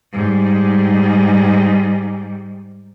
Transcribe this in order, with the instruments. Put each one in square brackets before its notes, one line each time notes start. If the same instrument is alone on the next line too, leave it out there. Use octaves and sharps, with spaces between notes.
[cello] G#2 G3